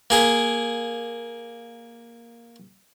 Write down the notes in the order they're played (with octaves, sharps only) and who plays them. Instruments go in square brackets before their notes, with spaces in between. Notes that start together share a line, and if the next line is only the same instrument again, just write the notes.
[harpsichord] A#3 G#4 A#4